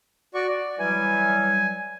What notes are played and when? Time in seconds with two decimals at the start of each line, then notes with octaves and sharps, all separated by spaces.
0.34 F#4 D5 C#6
0.49 D5
0.79 E3 F#3 G3 G#5